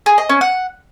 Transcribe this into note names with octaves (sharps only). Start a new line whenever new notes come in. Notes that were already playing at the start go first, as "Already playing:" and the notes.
G#4
D#5
C#4
F#5